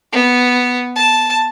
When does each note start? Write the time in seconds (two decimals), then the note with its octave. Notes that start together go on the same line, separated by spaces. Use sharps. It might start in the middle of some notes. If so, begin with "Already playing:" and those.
0.13 B3
0.96 A5